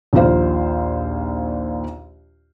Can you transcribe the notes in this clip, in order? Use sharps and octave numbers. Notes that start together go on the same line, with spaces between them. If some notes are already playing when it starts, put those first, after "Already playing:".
A#1 D#2 A#2 F4 C5 F5